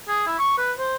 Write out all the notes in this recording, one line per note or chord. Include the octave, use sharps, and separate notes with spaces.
G#4
E4
C#6
B4
C5